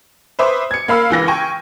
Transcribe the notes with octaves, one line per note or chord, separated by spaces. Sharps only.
B4 C5 E5 D6 D#6
G#6 C#7
A#3 F5 B5 E6 F6
C#2 E3 A#6
G5 G#5 C#6